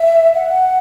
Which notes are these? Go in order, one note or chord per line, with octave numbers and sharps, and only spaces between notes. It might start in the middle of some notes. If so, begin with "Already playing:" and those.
Already playing: E5
F#5